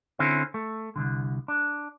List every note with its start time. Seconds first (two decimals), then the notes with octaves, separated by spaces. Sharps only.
0.19 D3 C4 C#4 E4
0.54 A3
0.96 C2 F2 D3
1.48 D4